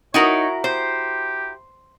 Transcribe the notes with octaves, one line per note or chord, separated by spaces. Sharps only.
D#4 E4 F#4 A#4 C#5
G4 C5